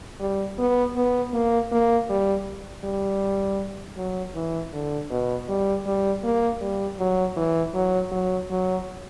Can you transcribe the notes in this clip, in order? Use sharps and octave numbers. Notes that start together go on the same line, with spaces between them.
G3
B3
B3
A#3
A#3
G3
G3
F#3
E3
D3
B2
G3
G3
A#3
G3
F#3
E3
F#3
F#3
F#3